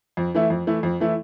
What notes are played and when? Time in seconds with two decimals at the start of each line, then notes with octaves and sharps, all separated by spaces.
0.17 F2
0.35 E3 A3 E4
0.50 F2
0.67 E3 A3 E4
0.83 F2
1.00 E3 A3 E4